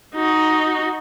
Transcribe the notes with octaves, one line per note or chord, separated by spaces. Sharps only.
D#4 F#4